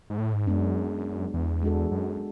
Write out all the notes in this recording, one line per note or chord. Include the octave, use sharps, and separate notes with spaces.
G#2
A2
G#2
F#2 G#3 B3 D4
E2
G#3 D4 F#4 A4
F#2